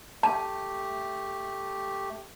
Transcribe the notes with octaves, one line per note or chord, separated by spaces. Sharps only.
A3 G4 A5